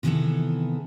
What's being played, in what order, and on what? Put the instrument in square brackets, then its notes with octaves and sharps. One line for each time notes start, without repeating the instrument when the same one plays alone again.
[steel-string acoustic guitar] C3 D#3 E3 B3 G#4 A4